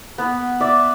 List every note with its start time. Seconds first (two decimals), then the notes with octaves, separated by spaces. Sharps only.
0.18 B3 B4
0.60 D5 E5